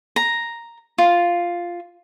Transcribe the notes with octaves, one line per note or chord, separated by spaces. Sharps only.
A#5
F4